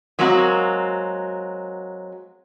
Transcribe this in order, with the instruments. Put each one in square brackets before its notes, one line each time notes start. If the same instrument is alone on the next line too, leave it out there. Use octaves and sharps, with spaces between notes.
[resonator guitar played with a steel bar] F#3 G#3 A#3 C4 F#4